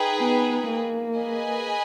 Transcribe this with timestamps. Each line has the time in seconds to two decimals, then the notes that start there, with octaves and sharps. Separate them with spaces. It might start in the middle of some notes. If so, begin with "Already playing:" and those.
Already playing: D#4 G#4 B4 G5
0.19 B3
0.69 A#3
1.18 G#4 B4 D#5 G#5